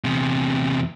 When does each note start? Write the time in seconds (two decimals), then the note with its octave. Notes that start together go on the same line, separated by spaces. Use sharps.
0.04 E2 C3